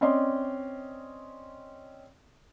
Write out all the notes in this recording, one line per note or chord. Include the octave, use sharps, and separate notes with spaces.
C4 C#4 D5 D#5 C6